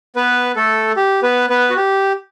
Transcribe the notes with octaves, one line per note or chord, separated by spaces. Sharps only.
B3 B4
A3 A4
G4
B3 B4
B3 B4
F#4
G4